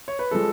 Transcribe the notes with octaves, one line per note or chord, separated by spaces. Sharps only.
C#5
B4
F3 G#3 A4